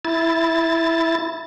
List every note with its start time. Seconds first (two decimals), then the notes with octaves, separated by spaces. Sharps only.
0.05 E4 A6